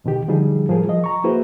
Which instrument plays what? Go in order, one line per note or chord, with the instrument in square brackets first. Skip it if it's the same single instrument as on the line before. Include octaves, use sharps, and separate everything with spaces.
[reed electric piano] E2 B2 D#3 G4
D3 F3 G3 D#4 G#4
A2 F3 G3 G#4 A#4
F3 D#5
A#5 C#6
A#3 E4 F#4 G#4 B4 C5